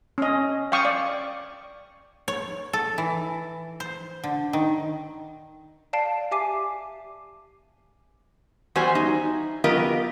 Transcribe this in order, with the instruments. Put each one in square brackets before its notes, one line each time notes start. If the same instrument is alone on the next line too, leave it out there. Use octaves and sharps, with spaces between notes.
[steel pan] C#4 D#5
F5 G5 C#6 D#6
D5
[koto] C#5
A4
E3
C5
D3
D#3
[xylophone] D5 F5 A5 C7 D7
G4 E5 G#5 D6 C7 D#7
[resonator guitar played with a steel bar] E2 G3 F#4 C5 G#5
D#4
F#3 B3 F4 G4 A#4 D#5